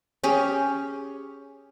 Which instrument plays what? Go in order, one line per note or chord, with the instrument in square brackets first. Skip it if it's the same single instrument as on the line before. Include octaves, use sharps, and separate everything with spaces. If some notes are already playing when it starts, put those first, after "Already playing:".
[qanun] C#4 G4 G#4 C#5